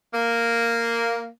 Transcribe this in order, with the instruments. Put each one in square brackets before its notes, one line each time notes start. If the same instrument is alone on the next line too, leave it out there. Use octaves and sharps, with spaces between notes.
[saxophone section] A#3